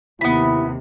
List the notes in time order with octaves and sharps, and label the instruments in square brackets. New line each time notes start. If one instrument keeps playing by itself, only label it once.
[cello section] D#2 C3 [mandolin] B3 B5 [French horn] E4